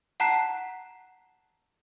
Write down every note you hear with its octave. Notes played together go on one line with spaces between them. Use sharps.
F#5 A5 A#5 F#6 B6 C7